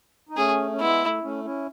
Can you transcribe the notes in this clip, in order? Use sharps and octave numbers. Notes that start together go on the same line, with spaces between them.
D#4
A3 C#4 G#4
C#4
G#3 B3 E4
A3
A3 C#4
C#4 E4